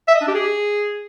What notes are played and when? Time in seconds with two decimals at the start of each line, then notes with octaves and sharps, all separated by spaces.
0.08 E5
0.14 D#5
0.21 D4
0.28 G4
0.34 G#4